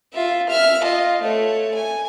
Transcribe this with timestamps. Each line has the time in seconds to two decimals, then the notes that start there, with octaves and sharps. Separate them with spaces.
0.13 F4 E5
0.49 E5 F6
0.83 F4 D#5
1.22 A3 C#5
1.74 G#5